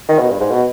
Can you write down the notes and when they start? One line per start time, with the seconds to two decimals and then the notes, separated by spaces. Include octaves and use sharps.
0.09 D#3
0.18 B2
0.30 G2
0.40 G#2
0.51 B2